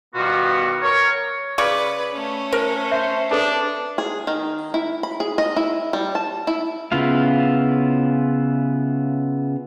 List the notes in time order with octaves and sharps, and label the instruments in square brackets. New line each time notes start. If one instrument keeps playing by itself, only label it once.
[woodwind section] B2 D#3 G3 B3 F4 F#4
A#4 C#5
[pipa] C#3 D5 C#6 [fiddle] B4
[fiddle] A3 C#4
[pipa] A#4 [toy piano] C5
[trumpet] C5 [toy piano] E5
[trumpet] D4 [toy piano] A4 B4 A5
[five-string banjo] G#4
D#3
E4
B5
G#4
D#5
E4
G3
A5
E4
[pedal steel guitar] C#3 B3 E4 F4 F5